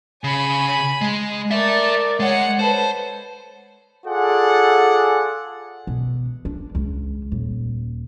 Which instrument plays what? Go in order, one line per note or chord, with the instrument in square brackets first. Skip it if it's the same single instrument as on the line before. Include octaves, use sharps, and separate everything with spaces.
[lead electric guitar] C#3 [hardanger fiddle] G#5 B5
[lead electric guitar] G#3
[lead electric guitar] A4 E5 [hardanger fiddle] A#4 D5
[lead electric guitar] G#3 [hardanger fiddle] C#5 F#5
[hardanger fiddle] A4 B4 [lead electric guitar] C5
[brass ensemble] F4 G#4 A4 D5 F#5
[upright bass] B2
D4
C#2
D#1